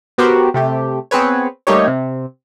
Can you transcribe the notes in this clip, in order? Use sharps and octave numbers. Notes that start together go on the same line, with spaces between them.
B3 F#4 G4 A#4 C5
C3 A3 G4
B3 C4 G#4 B4 C#5
G3 A3 A#3 D#4 G4 C#5
C3